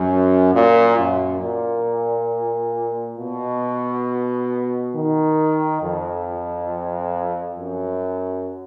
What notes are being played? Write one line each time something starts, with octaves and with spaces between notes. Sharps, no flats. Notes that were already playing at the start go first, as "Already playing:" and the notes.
Already playing: F#2
A#2
F#2
A#2
B2
D#3
F2
F#2